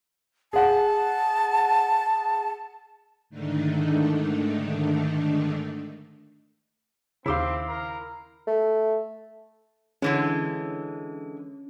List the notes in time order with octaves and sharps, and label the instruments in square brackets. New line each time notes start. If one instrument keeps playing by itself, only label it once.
[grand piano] G#4 F#5 [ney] A5
[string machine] G#2 D3 D#3 A3 D4 D#4
[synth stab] D#2 C#3 [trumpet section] C4 [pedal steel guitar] E4 C6 [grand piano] F5 D6 E6
[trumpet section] A#4 A#5
[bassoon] A3
[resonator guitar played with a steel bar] D3 E3 G#3 [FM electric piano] C#4